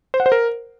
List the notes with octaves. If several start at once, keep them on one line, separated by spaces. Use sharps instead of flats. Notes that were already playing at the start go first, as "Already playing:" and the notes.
C5
F#5
C5
A#4